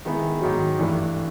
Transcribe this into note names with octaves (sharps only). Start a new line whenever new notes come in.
D#3 G#3 B3 E4
G#2 D#3 F#3
G2 E3 A3 D4